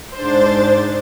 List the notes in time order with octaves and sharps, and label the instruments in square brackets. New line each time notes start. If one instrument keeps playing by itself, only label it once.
[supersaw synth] G#2 D4 A6 [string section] C5